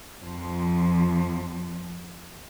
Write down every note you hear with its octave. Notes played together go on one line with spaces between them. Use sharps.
F2 F3